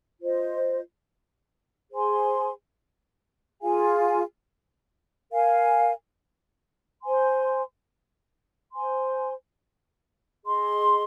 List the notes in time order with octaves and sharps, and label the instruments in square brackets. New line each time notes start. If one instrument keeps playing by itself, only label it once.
[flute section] F4 C5 D#5
G#4 C5 G#5 C6
F4 G#4 F5 G#5
A#4 F5 G#5
C5 G#5 C6
C5 G#5 C6
G#4 D#5 C6